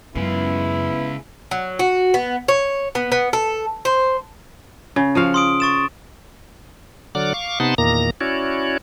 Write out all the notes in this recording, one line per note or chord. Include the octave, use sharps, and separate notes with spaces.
F#2 C#3 G#3 B3 E4
F#3
F#4
B3
C#5
B3
B3
A4
C5
C#3
F3 F#4 F5
C6 D#6 D7
C#6 A6 E7
D3 F#3 D5 F#5 D6 F6
F5 C#6 D6
C3 B3 D#4 F#5 A5 C6
E2 A#2 D#3 A#3 A#5 A#6
C#4 E4 F#4 C#5 D5